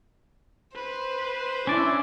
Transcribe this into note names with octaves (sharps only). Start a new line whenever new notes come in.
B4 C5
C#4 D4 E4 D5